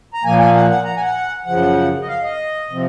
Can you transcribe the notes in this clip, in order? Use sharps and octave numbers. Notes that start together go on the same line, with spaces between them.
A#5
A#2 F3 A#3 G#5
G#5
F#5
F#5
A#5
G#5
F#5
F#2 C#3 F3 F#5
D#5
F5
D#5
C3 F3 C4